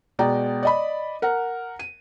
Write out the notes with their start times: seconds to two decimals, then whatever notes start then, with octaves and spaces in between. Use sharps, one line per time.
0.19 B2 G#3 D5 G5 A#5
0.63 D5 D#5 B5
1.22 A#4 F#5
1.79 D#7